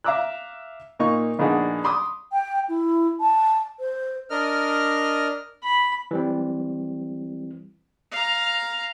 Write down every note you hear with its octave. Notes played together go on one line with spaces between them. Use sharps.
E5 F5 A#5 D6 E6 F#6
A#2 A#3 D#4 C#6
A#1 B3 D4 D#4 G#4 F#5
B5 C6 D6 D#6
G5
E4
A5
C5
D4 A#4 D#5 F6
B5
E3 G3 C4
F5 A#5